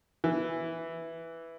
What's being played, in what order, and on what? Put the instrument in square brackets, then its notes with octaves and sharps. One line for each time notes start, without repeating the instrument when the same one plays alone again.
[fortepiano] E3